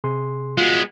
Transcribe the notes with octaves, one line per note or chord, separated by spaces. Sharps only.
C3 G#4 C6
G#3 B3 F4 F#4